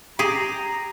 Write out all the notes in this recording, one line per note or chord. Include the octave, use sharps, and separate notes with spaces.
G4 G#4 A#5